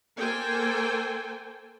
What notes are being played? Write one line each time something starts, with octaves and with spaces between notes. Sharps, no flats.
A#3 A4 C5 G5 G#5